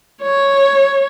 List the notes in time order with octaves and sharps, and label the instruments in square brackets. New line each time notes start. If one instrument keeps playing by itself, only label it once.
[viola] C#5